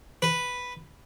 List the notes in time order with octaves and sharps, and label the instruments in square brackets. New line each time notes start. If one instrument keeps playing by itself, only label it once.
[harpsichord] B4